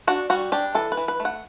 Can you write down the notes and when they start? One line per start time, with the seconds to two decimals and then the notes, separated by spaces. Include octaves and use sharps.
0.07 D4 F#4
0.30 G3 F#4
0.52 D4 G4
0.75 E3 A4
0.92 B4
0.97 E3
1.08 B4
1.20 A3
1.25 F#5